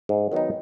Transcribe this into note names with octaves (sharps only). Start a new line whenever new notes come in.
G#2
D#3 F#3 B3 D#4